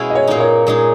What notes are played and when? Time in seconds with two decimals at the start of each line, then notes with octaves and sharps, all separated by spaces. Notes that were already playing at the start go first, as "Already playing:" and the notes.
Already playing: B2 G#3 C#4 E4
0.10 D#5
0.15 C#5
0.27 A#2 A#3 D#4
0.40 C#5
0.67 A#2 G#3 D#4